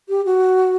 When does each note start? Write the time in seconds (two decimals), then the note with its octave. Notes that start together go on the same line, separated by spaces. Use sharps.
0.09 G4
0.25 F#4